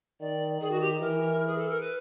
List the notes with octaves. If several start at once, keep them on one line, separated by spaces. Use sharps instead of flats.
D#3 D5
D#3 G#4
F#4
G4
E3 A#4
G#4
A4
A#4
B4